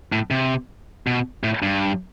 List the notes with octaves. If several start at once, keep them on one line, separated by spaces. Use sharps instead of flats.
A2
C3
B2
A2
G2